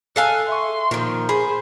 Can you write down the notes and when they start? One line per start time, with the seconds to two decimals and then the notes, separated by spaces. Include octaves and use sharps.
0.16 A4 F5 G#5 F#6
0.49 E5 C6 C#6
0.91 A#2 D#3 F3
1.29 G#4 C5 B5